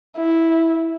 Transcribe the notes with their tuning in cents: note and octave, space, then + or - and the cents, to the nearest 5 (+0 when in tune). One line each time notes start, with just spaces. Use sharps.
E4 -5